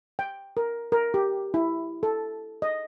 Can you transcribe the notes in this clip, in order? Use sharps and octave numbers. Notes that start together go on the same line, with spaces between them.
G5
A#4
A#4
G4
E4
A4
D#5